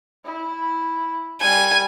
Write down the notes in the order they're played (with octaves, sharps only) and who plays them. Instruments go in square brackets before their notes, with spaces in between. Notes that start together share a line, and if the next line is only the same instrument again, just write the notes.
[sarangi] E4
[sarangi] G3 [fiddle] G#5